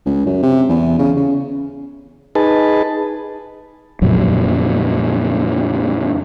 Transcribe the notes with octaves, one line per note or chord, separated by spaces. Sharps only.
C#2
F#2
C3
E2
C#3
C#3
D#4 G#4 B4 A5
F2 A#2 C#3 F#3